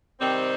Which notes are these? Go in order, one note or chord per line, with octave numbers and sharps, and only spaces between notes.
C3 D#3 G3 C4